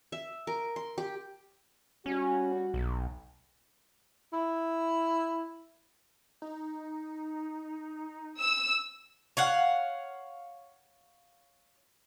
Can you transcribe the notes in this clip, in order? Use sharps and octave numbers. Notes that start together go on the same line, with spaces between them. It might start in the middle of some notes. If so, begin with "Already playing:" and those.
E5
A#4
C6
G4
G3 C#4 F#4
B1
E4
D#4
E6
C#5 F5 F#5